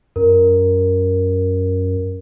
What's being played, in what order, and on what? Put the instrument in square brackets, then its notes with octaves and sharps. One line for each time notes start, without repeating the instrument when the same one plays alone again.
[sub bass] F#2 [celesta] A#4